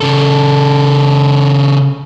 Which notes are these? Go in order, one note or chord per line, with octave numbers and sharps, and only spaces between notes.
C#3 A4